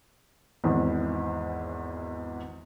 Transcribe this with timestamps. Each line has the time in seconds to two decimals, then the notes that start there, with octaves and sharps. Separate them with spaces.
0.64 G#1 E2 G#2 E3